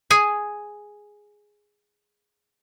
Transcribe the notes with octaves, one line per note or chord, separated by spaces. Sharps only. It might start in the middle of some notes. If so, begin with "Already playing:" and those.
G#4 G#5